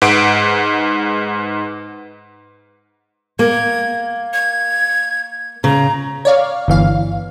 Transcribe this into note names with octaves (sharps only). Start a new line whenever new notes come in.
G#2 B4 F#5 D7
A#3 G#6
G#6
C#3 A#5
C#5 D5 F5
G1 E3 F5